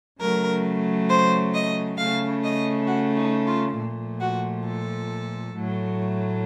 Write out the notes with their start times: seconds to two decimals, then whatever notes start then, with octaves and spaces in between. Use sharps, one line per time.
0.20 C#3 F#3 A3 A#4
1.09 C5
1.54 D#5
1.97 C#3 A3 F5
2.43 D#5
2.87 F#4
3.16 D#4
3.47 F4
3.77 A#2 F3 A3
4.20 F#4
4.65 A4
5.55 A2 F#3 A3